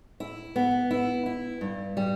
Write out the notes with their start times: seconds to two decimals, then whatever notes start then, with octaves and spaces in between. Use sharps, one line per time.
0.20 E4
0.56 B3
0.91 E4
1.26 E4
1.61 G2
1.97 G3